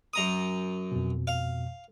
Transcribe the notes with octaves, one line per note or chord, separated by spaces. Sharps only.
F#2 A#5 D#6
F2 B2
F5